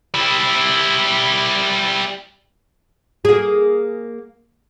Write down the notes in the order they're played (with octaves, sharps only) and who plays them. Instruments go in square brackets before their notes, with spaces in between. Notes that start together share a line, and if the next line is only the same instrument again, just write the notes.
[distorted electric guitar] G3 E4
[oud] A#3 G#4